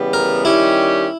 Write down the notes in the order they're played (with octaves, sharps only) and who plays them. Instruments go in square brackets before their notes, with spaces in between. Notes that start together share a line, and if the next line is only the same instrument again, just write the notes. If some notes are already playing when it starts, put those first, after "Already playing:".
Already playing: [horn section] C#3 E3 G3 B3 G4
[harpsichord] A#4
[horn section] D#3 G3 C#4 G4 [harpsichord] E4